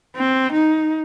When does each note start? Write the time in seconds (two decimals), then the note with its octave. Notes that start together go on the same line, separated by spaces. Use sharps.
0.16 C4
0.53 D#4